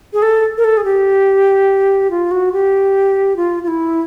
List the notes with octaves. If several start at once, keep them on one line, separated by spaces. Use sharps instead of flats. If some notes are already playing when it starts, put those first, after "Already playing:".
G#4
A4
A#4
A4
G#4
G4
F4
F#4
G4
F4
F4
E4